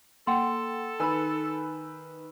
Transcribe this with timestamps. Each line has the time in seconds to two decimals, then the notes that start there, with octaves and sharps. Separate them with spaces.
0.27 A#3 A4 F#5 G5 C6
1.00 D#3 B4 G#5 B5 E6